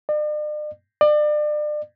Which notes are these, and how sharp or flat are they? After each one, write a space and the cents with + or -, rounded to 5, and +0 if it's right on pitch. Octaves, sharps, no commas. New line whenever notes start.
D5 +45
D5 +35